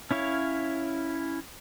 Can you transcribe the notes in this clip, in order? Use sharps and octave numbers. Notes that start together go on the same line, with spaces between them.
C#4 E4 C#5 F5